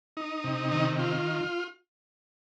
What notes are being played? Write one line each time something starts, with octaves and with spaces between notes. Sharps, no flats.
D#4
C3
D#3
F4